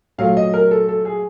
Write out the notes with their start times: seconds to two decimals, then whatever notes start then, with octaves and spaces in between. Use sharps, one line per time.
0.18 A#2 F#3 A3 F5
0.37 D#5
0.54 A#4
0.71 A4
0.89 A4
1.05 G#4